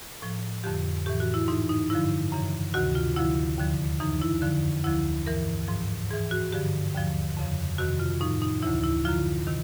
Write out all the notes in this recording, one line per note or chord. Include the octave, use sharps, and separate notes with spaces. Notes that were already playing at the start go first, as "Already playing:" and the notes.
A2 F3
F2 D3 F3 G4
A2 E3 G4
F#4
E4
G#2 E3 D#4
D#4
G2 D3 F3 E4
F#2 C#3 E3
D2 C3 D#3 F#4
F4
D2 D3 F3 E4
D#2 D3 F3
F#2 C#3 E3 D#4
E4
F2 D3 F3
D2 D3 F3 E4
G2 E3 A#4
G#2 F3
G#2 E3 G#4
F#4
G2 D3 F3 G4
D#2 D3 F3
F2 C#3 F3
F2 C3 D#3 F#4
F4
A2 F3 D#4
D#4
D2 C#3 E3 E4
E4
F#2 D3 F3 F4
C3 D#3